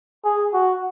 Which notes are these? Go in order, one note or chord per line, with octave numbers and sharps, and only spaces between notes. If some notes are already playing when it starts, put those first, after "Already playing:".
G#4
F#4